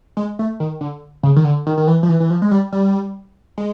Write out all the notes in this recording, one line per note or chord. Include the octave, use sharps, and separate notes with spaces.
G#3
A3
D#3
D3
C#3
D#3
D3
D#3
D#3
E3
F3
E3
E3
F3
G#3
G3
G3
G#3